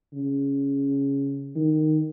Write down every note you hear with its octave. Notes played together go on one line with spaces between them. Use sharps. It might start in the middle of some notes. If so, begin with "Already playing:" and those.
C#3
D#3